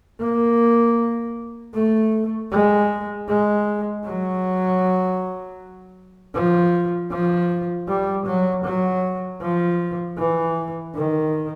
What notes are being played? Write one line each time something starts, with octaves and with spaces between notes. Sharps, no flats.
A#3
A3
G#3
G#3
F#3
F3
F3
G3
F#3
F#3
F3
E3
D#3